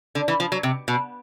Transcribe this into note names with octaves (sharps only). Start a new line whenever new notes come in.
D3
E3
F3
F#3
C3
B2